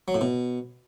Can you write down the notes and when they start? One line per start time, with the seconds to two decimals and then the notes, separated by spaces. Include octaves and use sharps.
0.08 F#3
0.15 A2
0.21 B2